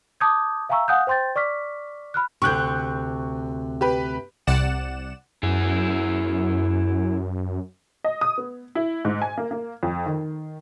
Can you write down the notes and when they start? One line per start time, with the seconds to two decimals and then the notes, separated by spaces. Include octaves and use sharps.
0.20 A5 D6 D#6 G6 G#6
0.69 E5 F5 G#5 A#5 C#6 E6
0.88 F5 F#5 G#5 D#6 F#6 G6
1.07 C5 G5 C6 G6 A6
1.36 D5 C#6 D6 F6 B6
2.14 B5 F6 F#6
2.42 D2 C3 C#6 F#6 G6
3.81 G4 B4
4.47 C2 C3 D5 F#5 E7
5.43 F#2 E4 G#4
8.04 D#5
8.21 D#6
8.38 B3
8.75 E4
9.05 G#2
9.22 G#5
9.38 A#3
9.51 A#3
9.83 F2
10.06 D#3